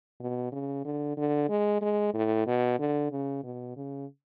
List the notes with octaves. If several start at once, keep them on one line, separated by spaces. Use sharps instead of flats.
B2
C#3
D3
D3
G#3
G#3
A2
B2
D3
C#3
B2
C#3